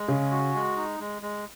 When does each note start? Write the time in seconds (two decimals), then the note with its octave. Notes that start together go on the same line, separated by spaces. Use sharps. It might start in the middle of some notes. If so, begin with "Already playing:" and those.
Already playing: G#3
0.08 C#3 C#4
0.32 F#4
0.54 G#3
0.77 D#4
1.00 G#3
1.22 G#3